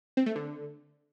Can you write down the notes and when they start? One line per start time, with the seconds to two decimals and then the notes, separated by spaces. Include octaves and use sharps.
0.17 C4
0.26 A3
0.36 D3